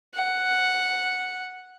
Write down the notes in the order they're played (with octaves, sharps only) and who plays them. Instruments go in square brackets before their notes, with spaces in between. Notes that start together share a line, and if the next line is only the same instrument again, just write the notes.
[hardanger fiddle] F#5